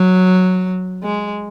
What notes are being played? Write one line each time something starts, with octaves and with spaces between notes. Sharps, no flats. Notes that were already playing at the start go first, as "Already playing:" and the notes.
Already playing: F#3
G#3